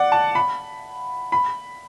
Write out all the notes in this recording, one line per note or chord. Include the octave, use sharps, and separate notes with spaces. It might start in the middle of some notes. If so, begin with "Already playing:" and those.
Already playing: D5 F#5
A5
B5
B5